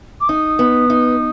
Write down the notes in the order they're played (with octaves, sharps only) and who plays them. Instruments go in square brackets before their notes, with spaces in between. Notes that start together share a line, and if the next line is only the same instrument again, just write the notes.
[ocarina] D6
[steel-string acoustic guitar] D#4 [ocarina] D#6
[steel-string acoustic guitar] B3
D#4